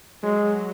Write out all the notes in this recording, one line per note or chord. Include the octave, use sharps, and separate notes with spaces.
F#3 G#3